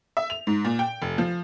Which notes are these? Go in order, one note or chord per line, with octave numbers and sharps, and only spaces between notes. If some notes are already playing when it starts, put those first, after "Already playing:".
E5
F7
G#2
A#2
G5
F1
F3